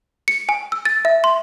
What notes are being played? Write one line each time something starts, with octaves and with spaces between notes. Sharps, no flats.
C#7
G#5
E6
A6
E5
C6